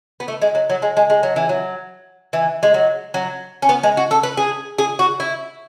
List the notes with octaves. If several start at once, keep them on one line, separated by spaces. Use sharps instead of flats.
B3
A3
G#3
F#3
F#3
G#3
G#3
G#3
F#3
E3
F#3
E3
G#3
F#3
F#3
C#4
B3
G#3
F#4
A4
B4
G#4
G#4
F#4
E4